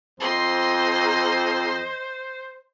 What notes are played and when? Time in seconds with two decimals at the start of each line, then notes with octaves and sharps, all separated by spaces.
0.20 F2 C5 D#5 C6